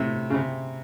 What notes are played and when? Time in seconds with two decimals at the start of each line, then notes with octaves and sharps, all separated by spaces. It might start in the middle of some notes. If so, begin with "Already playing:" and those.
Already playing: A2 C3
0.30 C#3
0.34 C3